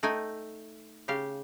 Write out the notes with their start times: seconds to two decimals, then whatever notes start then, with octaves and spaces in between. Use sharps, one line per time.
0.03 A3 D#4 G5 G#5
1.08 C#3 G4 F5